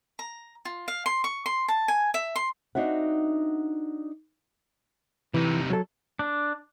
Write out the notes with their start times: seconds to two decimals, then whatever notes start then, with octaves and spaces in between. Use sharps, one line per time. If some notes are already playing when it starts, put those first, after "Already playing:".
0.19 A#5
0.65 F4
0.88 F5
1.06 C6
1.24 C#6
1.46 C6
1.68 A5
1.88 G#5
2.14 E5
2.36 C6
2.75 C4 D4 D#4 F#4 E5 F#5
5.34 C3 E3 D#4
5.70 F#3 A4
6.19 D4